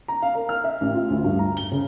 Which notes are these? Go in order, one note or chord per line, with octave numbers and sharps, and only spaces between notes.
A#5
F5
A#4
F6
E5
A1
F4
D2
G2
A#5
G7
C#3